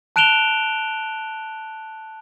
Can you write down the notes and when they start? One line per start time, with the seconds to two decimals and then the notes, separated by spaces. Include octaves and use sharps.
0.16 A5 F#6 D7 E7 F7 G7